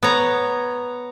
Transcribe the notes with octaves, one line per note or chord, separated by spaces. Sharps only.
B3 C#5 A#5